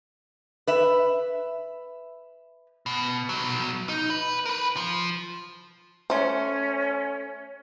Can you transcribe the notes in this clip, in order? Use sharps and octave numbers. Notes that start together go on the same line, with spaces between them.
B4 E5
B2
B2 F#3
D#4
B4
A#4 B4
F3
A3 C#4 C5